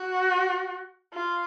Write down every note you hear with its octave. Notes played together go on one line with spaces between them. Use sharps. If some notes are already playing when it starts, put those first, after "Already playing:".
Already playing: F#4
F4